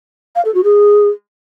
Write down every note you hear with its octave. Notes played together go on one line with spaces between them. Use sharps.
F5
A4
F#4
G#4